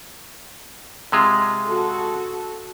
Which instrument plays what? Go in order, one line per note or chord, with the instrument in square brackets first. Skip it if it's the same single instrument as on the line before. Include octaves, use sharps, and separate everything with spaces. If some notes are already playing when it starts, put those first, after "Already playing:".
[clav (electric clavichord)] C3 G#3 F4
[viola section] F#4 A4